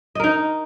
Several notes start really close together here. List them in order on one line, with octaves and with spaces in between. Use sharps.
D#5 A#4 D#4